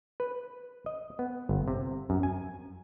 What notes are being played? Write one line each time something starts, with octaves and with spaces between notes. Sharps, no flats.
B4
D#5
B3
G1
C3
F#2
G#5